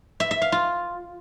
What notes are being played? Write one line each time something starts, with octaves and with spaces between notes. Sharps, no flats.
E5
E5
F5
F4